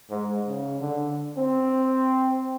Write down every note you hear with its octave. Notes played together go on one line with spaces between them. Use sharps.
G#2
C#3
D3
C4